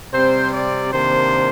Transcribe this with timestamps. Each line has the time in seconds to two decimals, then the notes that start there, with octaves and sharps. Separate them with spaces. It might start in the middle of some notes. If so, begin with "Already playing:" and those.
0.13 C3 G3 C4 C5
0.53 D5
0.92 C3 D#3 A#3 D4 C5